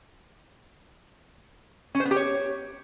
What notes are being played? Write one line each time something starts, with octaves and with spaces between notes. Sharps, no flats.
C#4
C5
B3
G4
C#5